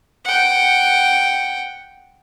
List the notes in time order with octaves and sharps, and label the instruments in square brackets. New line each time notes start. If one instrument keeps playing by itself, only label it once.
[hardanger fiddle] F#5 G5